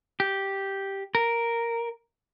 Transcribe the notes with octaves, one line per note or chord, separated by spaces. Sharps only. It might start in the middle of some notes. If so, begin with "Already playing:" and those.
G4
A#4